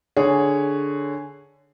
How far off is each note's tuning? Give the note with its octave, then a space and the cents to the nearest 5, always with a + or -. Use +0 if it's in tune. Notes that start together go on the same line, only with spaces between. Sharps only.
D3 +0 G#4 +0 C#5 +0